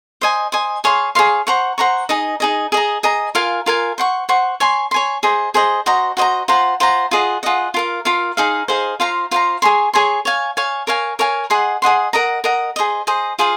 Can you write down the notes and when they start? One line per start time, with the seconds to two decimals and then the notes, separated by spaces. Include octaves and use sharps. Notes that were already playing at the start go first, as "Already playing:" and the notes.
0.21 C5 D#5 G#5
0.52 C5 D#5 G#5
0.84 G#4 C#5 F5 C6
1.15 G#4 C#5 F5 C6
1.47 C5 F#5 A#5 C#6
1.78 C5 F#5 A#5 C#6
2.09 D#4 G#4 D#5
2.40 D#4 G#4 D#5
2.72 G#4 D#5 A#5
3.03 G#4 D#5 A#5
3.35 F4 A#4 F5 G#5
3.66 F4 A#4 F5 G#5
3.98 C5 F#5 C#6
4.29 C5 F#5 C#6
4.60 C#5 G#5 C6
4.91 C#5 G#5 C6
5.23 G#4 C5 D#5
5.54 G#4 C5 D#5
5.86 F#4 C5 D#5 A#5
6.17 F#4 C5 D#5 A#5
6.48 F4 C5 F#5 A#5
6.80 F4 C5 F#5 A#5
7.11 F4 G#4 D#5 F#5
7.43 F4 G#4 D#5 F#5
7.74 F4 A#4 F5
8.05 F4 A#4 F5
8.37 D#4 G#4 C5 F5
8.68 D#4 G#4 C5 F5
9.00 F4 C5 F5 A#5
9.31 F4 C5 F5 A#5
9.62 G#4 C#5 G#5 C6
9.94 G#4 C#5 G#5 C6
10.25 C#5 F5 G#5
10.57 C#5 F5 G#5
10.87 A#4 C#5 F5 G#5
11.19 A#4 C#5 F5 G#5
11.50 G#4 D#5 F#5 C6
11.82 G#4 D#5 F#5 C6
12.13 A#4 D#5 F#5 A#5
12.44 A#4 D#5 F#5 A#5
12.76 G#4 C5 D#5
13.07 G#4 C5 D#5
13.39 F4 G#4 C5 F5